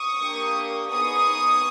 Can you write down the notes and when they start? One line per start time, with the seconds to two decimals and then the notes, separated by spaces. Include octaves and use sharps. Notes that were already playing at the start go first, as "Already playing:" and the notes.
Already playing: C#6 D#6
0.21 A#3 D4 G4
0.91 B3 D#4 G#4 C#6 D#6